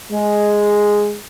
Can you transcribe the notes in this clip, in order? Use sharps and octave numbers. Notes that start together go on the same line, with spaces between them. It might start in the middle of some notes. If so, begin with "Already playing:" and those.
G#3